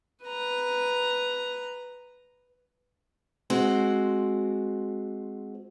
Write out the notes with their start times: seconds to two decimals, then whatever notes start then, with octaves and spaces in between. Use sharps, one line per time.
0.23 B4 A#5
3.50 G#3 C4 F#4 C5